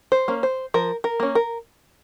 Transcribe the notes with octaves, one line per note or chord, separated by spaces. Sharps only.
C5
A#3 C#4
C5
F3 A#4
A#4
A#3 C#4
A#4